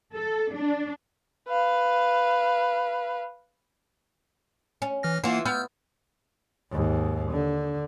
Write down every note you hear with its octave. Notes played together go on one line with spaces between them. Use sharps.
A4
D4
B4 F5
C#4
E3 F6 A#6
E3 A#3 F4 F#5 C7
B3 E6 F6 G6
D#2 G#2
D3